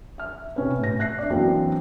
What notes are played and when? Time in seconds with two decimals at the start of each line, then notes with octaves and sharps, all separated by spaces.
0.18 E5 F6
0.56 C3 C#4 B4
0.79 A2 A#6
0.99 E5 F#6 A#6 C7
1.18 D4 D5
1.30 F#2 E3 F#3 A#3 C4 D4